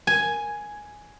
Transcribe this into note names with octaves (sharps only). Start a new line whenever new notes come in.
G#5